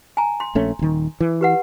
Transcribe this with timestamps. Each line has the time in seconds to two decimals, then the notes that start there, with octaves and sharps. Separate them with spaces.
0.17 G#5 A#5
0.40 C6
0.55 A#1 A3 C#4
0.79 D#1 D#3
1.20 E3
1.41 G4 B4 F#5